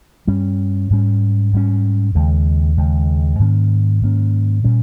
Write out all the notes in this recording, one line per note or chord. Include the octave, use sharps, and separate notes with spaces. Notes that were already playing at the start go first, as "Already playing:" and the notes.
G2 G3 C#4
G#2 G3 C#4
G#2 G3 C#4
D#2 C#3 G#3
D#2 C#3 G#3
G#2 D#3 A#3 C#4
G#2 D#3 A#3 C#4
A#2 G3 C#4